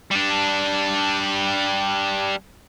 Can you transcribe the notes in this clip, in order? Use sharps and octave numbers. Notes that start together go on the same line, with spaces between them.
G3 D4